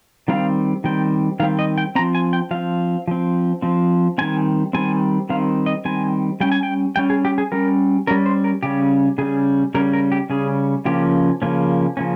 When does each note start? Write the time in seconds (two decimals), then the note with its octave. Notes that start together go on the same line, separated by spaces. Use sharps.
0.28 D#3 G3 C4 F5
0.84 D#3 G3 C4 G5
1.40 D#3 G3 C4 F5
1.59 D#5
1.78 G5
1.95 C4 A#5
1.99 F3
2.15 G#5
2.33 G5
2.51 F3 C4 F5
3.08 F3 C4
3.62 F3 C4
4.18 D#3 G3 C4 G#5
4.73 D#3 G3 C4 G#5
5.29 D#3 G3 C4 F5
5.66 D#5
5.85 D#3 G3 C4 G#5
6.40 G3 C#4 G5
6.52 G#5
6.63 G5
6.96 G3 C#4 G5
7.10 G#4
7.25 G4
7.38 G#4
7.52 G3 C#4 A#4
8.07 G3 C#4 A#4
8.26 C5
8.44 A#4
8.63 C#3 G3 C#4 G4
9.18 C#3 G3 C#4 G#4
9.75 C#3 G3 C#4 A#4
9.93 A#4
10.12 G4
10.30 C#3 G3 C#4 G#4
10.85 C#3 F3 A#3 C#4 G4
11.42 C#3 F3 A#3 C#4
11.97 C#3 F3 A#3 C#4